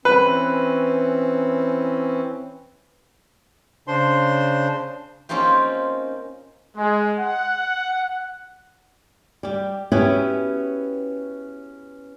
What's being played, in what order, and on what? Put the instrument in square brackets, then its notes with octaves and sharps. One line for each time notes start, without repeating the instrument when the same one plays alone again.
[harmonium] E3 C4 C#4 [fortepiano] B4
[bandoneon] C#3 D4 C5 C6
[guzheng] A#3 C4 C#4 D#4 F4 G4
[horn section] G#3
F#5
[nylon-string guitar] G3 G4
B3 C#4 E4 F#4 G4 B4